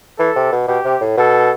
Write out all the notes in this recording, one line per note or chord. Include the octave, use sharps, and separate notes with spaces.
E3 A4
C3
B2
B2 G4
C3
A2
B2 A4